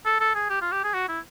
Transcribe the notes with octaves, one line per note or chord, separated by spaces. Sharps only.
A4
A4
G#4
G4
F4
G4
G#4
F#4
E4